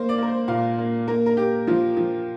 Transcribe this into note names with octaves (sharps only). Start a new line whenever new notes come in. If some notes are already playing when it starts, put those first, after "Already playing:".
Already playing: A#3 C5
D5
A#3 A#4
C5
A#2 F5
A#3
A#3 A#4
A#4
A#3 G4
F3 F4
F3